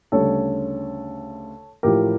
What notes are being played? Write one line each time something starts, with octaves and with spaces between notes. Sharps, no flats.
D2 C#3 G3 A4 C#5
A1 A2 F3 G4 A#4